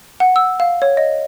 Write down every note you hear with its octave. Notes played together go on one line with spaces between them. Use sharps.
F#5
E6
F5
C#5
D#5